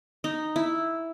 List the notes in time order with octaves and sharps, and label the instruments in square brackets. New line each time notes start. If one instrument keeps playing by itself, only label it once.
[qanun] D#4
E4